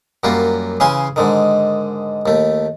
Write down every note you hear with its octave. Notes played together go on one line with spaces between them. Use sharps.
F#2 F#3 G3 A#3 F4
C#3 E3 C#4 F5 G#5 C6
G#2 D3 D#3
D#2 A3